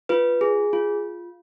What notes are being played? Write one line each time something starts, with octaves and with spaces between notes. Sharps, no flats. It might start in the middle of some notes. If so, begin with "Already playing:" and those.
F4 B4
G#4
F4